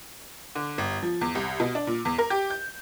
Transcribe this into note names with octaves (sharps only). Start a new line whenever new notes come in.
D3
G1
F3
E2
C2
B2
D4
A#2
E2
A#4
G4
G6